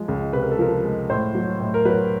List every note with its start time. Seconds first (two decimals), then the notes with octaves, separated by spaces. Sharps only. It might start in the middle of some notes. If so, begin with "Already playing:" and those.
Already playing: F3 G#3
0.08 C#2
0.33 C3 B4
0.43 A#4
0.51 A4
0.59 F3 A#4
0.84 G#3
1.10 A2 C5
1.35 F#3
1.60 A2
1.74 A#4
1.85 F#3 B4